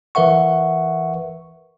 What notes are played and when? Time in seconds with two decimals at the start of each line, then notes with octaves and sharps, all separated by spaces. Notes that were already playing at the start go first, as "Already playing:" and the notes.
0.15 E3 A#4 B4 E5 F#5 C#6